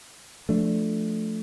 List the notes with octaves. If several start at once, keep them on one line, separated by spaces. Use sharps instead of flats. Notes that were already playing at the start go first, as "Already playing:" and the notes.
F3 A3 D4